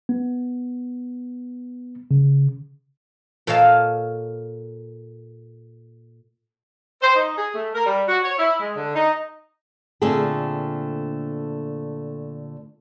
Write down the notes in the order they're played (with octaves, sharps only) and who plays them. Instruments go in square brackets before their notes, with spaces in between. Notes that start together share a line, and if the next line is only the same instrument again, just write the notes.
[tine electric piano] B3
C#3
[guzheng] A#2 A4 C#5 D#5 F5 A5
[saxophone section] C5
D#4
G#4
A3
A#4
G3
F#4
C#5
E4
G#3
D3
D#4
[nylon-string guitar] A#2 D3 A3 C4 G#4 A4